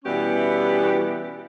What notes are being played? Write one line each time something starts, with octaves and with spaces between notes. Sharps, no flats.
B2 E3 G3 B3 C#4 G4